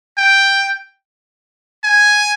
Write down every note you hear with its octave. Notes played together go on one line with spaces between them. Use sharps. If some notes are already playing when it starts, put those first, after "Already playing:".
G5
G#5